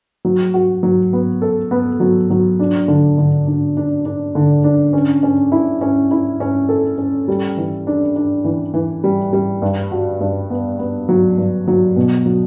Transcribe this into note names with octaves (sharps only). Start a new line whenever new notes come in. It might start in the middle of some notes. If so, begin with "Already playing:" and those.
F#3
F#4
F#3
B3
A4
B3
F#3
F#3
D4
D3
D3
D4
D4
D4
D3
D4
C#4
C#4
E4
C#4
E4
C#4
A4
C#4
G3
E3
D4
D4
E3
E3
G3
G3
G2
F#4
G2
B3
B3
F#3
G2
F#3
B2
F#3